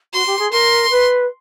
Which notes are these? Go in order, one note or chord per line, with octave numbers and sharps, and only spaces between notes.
F#4 C6
G4
G#4
A#4 C6
B4